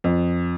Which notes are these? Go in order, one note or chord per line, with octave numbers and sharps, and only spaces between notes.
F2